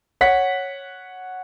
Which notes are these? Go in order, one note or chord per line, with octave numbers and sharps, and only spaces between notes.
C#5 F#5 B6